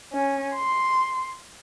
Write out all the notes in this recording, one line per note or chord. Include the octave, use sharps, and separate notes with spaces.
C#4
C6